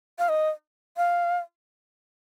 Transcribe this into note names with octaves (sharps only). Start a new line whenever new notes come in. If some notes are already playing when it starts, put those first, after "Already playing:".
F5
D#5
F5